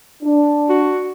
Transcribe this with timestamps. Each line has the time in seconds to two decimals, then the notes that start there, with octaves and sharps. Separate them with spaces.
0.23 D4
0.69 F#4